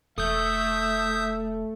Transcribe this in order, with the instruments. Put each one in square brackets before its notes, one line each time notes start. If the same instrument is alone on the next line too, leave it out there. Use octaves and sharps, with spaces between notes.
[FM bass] E1 [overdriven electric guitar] A3 [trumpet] E5 [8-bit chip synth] D#6 G6